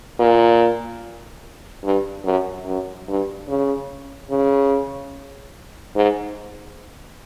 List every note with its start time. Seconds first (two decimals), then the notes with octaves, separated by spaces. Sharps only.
0.19 A#2
1.84 G2
2.25 F#2
2.66 F#2
3.08 G2
3.48 C#3
4.31 C#3
5.96 G#2